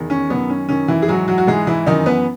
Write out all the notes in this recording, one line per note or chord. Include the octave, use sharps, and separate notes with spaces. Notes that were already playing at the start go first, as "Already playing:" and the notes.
Already playing: E2 D#3
C#4
F#2 D#3 B3
C#4
F#2 D#3 C#4
E3 E4
G#4
G#2 E3 F#3 F#4
F#3 F#4
F#4
G#2 E3 G#3 G#4
E3 E4
F#2 D#3 E3 D#4
B3 B4